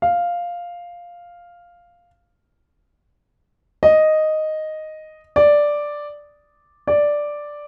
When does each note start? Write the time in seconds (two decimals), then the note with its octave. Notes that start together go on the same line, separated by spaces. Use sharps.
0.02 F5
3.83 D#5
5.36 D5
6.87 D5